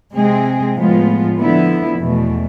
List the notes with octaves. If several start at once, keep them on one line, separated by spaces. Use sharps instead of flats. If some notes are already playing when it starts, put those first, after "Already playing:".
C3 G#3 C4 G#4
A2 F3 G#3 B3 F4
D3 F3 B3 E4
E2 B2 A3